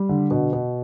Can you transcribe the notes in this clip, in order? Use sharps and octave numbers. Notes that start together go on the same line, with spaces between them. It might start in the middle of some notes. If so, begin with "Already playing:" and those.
Already playing: G3
D3
B2
B2